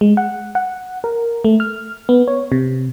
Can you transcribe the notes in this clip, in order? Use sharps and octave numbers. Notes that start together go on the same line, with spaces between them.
G#3
F#5
F#5
A#4
A3
F6
B3
C#5
C3